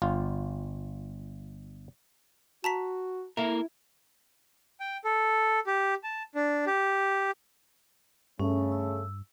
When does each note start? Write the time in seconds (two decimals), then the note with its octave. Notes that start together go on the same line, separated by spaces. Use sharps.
0.02 G1 F4
2.64 F#4 A5 A#5 B6
3.37 A#3 E4 A4 A#4
4.80 G5
5.05 A4
5.67 G4
6.04 A5
6.35 D4
6.67 G4
8.40 G2 C#3 A3 C#4
8.72 E6